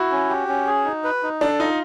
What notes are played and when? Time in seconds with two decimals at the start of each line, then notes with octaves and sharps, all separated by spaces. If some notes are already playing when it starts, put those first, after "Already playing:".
Already playing: E4 F#4
0.12 C#4
0.29 G4
0.48 C#4
0.67 G#4
0.85 D#4
1.04 B4
1.23 D#4
1.41 D4 A4
1.60 D#4 F4